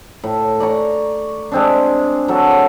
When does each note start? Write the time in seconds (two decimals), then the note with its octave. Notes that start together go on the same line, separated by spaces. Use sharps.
0.24 A2
0.60 D5 A#5 C#6
1.52 G#3 C4 D4
2.28 F#3 A4